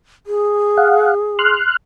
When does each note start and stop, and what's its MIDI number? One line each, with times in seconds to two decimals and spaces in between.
0.26 1.55 68
0.78 1.14 77
0.78 1.14 78
1.39 1.76 84
1.39 1.76 89
1.39 1.76 90